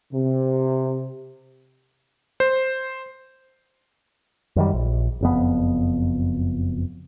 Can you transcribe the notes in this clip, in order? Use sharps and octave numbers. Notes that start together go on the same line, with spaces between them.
C3
C5
F#2 D#3 G3
A#1
F#1 F2 B3